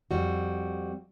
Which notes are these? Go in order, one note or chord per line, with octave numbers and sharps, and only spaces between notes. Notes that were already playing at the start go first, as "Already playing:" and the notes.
F2 G3 F#4